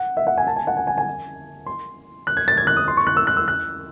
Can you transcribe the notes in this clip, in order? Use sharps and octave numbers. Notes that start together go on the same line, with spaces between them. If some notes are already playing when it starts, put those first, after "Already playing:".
Already playing: F#5
E5
F#5
G#5
A5
G#5
F#5
G#5
G#5
G#5
C6
F#6
G#6
A6
G#6
F#6
D#6
C6
C#6
F#6
E6
F#6
E6
F#6